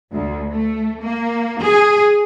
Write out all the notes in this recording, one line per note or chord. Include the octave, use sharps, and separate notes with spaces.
D2
A3
A#3
G#4